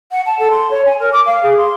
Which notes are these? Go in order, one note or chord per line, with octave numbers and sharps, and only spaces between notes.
F#5
A5
A4
C6
C#5
G#5
A#4
D6
F5
G#4
C6